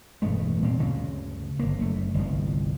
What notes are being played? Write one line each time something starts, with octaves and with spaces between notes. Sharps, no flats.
E1 G2 G#3 A3
A#2 C4
D2 G2 C#3
G1 A#3
F#1 A3
G1 C2 F3